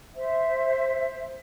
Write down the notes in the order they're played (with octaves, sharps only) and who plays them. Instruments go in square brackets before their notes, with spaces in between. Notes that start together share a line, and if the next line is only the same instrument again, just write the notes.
[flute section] C5 E5